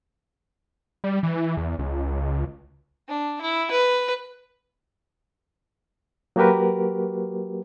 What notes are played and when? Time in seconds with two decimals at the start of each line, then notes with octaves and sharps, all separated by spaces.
1.04 G3
1.23 E3
1.57 E2
1.79 C#2
3.08 D4
3.41 E4
3.71 B4
6.36 F#3 A#3 F#4 G4 A#4 B4